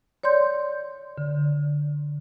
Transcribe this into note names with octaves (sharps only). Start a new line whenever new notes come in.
C#5 D5 C6 G6
D3